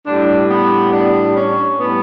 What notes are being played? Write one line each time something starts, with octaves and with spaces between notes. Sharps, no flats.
A2 G3 D4
B3
D4
C#4
A2 G3 B3